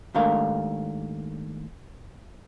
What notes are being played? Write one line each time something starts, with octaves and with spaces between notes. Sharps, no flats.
D#2 G#2 A3 D4 A#4 F5